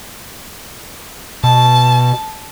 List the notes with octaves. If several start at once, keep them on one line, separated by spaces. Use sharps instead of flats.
B2 A5